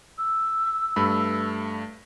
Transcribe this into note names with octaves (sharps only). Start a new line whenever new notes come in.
E6
G2 A3 B5